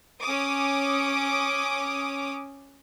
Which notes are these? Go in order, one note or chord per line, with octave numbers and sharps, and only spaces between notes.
C#4 D6 D#6